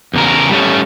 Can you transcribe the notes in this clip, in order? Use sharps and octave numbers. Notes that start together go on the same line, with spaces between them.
E2 C#3 A#4
G3 A3 C#4